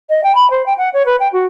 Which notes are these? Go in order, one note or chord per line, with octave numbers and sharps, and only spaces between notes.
D#5
G5
B5
C5
G5
F#5
C#5
B4
G5
F#4